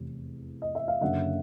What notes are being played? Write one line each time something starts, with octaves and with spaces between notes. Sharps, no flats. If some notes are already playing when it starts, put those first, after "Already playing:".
Already playing: F1 E2 C3
D#5
E5
F5
F#1 F#2 D3 E5 F#5